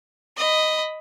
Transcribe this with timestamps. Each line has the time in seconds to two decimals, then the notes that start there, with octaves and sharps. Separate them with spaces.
0.37 D#5 B5